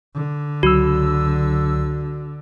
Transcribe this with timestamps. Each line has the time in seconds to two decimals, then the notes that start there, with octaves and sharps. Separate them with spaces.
0.15 D3
0.63 C#2 F#3 F#4 E6